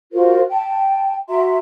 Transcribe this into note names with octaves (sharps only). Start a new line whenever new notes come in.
F4 F#4 A#4 C5
G5 A5
F#4 E5 A#5 C6